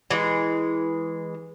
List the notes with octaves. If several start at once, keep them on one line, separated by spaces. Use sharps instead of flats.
E3 G#3